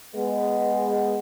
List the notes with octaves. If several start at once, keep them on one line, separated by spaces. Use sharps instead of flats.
G#3 B3